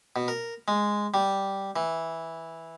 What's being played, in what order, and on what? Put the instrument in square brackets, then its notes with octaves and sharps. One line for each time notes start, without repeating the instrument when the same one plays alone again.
[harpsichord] B2
A#4
G#3
G3
E3